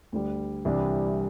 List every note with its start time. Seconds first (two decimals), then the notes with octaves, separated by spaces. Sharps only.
0.12 D2 D3 G3
0.65 C2 C3 E3 G3 D4